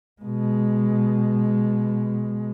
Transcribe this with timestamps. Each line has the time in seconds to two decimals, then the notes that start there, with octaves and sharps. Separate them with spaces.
0.22 B2 G#3